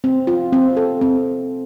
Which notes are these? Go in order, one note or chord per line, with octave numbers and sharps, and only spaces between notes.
C4
F4
C4
A4
C4